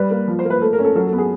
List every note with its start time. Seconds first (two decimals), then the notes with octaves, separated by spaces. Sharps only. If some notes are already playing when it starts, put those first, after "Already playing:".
Already playing: G3 B4
0.11 A#3
0.28 F3
0.39 C5
0.45 A#3
0.50 B4
0.62 A3 A4
0.73 A#4
0.79 C#4
0.84 A4
0.95 F#3 A4
1.07 A4
1.13 B3
1.18 G#4